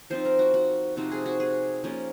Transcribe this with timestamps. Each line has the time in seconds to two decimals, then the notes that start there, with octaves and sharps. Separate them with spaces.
0.10 F3 C4 D#4 C5
0.25 A#4
0.39 F#4
0.54 F#4
0.96 C3 F3 C4 D#4 F#4
1.12 G#4
1.26 F#4
1.40 G#4
1.84 F3 A#3 C#4